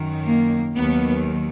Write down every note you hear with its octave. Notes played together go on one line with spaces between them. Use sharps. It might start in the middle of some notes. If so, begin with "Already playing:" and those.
Already playing: F#2 D#3 F#3
A#3
D#2 D#3 F#3 B3